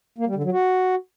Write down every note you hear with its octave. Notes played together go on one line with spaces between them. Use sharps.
A#3
G3
D3
F#3
F#4